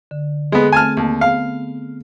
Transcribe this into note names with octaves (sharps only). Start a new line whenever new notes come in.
D3
G#3 B3 G#4 A4
A3 C4 G#5 A5 F6
D#2 A5
B3 F5